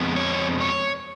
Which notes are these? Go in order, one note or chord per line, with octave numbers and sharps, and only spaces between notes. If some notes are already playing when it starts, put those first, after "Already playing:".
Already playing: F2 G#3 B3
C#5
C#5